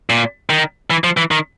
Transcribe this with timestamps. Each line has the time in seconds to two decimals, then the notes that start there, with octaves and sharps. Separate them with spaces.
0.10 A#2
0.50 D#3
0.90 E3
1.04 F3
1.17 E3
1.31 D#3